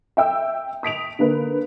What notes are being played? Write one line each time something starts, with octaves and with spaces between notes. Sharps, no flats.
E5 G5 E6
D#6 B6 D7 F7
D3 A#3 B4